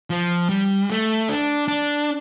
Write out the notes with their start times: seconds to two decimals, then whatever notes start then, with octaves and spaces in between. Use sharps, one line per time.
0.10 F3
0.49 G3
0.90 A3
1.29 D4
1.68 D4